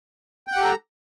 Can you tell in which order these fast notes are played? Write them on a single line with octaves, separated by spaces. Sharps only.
G5 F#5 G4 A4 A#5